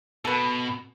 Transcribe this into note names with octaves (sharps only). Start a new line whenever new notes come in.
B2 A4 B4